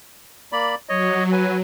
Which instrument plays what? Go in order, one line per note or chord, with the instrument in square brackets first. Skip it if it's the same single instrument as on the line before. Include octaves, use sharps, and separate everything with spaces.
[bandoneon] A#3 D5 B5
[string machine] F#3 [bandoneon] C#5 D#5
[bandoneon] B4 G#5